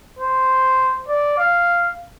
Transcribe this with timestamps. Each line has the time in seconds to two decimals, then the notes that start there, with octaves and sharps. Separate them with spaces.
0.19 C5
1.08 D5
1.39 F5